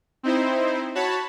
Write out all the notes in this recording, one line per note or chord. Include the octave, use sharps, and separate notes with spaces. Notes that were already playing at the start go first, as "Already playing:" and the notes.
C4 D#4 E4 C5
F#4 C#5 A5 B5